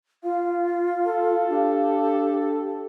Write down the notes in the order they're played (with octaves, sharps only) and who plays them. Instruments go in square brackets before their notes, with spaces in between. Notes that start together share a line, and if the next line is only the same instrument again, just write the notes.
[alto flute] F4 [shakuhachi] F5
[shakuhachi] F5
[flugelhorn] A4
[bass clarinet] D4 [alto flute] G4